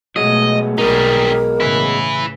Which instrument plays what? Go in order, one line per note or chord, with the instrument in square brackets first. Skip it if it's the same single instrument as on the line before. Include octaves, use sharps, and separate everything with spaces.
[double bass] B2 A3 [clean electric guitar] F#3 G#3 B3 [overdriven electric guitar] D#5
[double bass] B1 [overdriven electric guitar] G3 D#4 [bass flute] A#4
[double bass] A2 C#3 [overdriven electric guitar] E4 B4